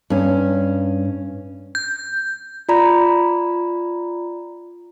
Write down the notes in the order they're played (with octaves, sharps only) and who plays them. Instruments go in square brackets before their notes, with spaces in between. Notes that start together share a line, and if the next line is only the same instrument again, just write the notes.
[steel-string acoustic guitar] G2 C#4
[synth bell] G6
[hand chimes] F4 D5 A#5 B5